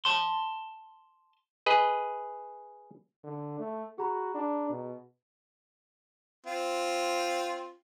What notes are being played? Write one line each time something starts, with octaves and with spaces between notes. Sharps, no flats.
A5 C6
G#4 B4 D#5
D3
A3
F#4 G#4 A#5 B5
D4
B2
C4 F4